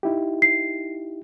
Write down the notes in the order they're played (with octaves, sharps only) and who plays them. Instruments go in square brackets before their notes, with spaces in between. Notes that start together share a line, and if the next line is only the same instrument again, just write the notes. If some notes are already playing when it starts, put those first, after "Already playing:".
[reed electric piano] D#4 E4 G4
[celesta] C7